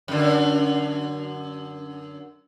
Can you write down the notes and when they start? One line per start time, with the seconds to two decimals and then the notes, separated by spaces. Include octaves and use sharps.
0.08 F#2 D3